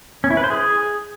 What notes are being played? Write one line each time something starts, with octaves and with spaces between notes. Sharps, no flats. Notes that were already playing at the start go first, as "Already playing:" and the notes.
C#4
E4
B4
C5
G#4